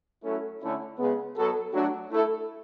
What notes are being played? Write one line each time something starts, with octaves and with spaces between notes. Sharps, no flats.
F#3 A3 C#4 E4 A4
D3 A3 C#4 E4
C#3 G#3 B3
B2 F#3 B3 F#4 A4
F#3 A3 D4 F#4
A3 E4 A4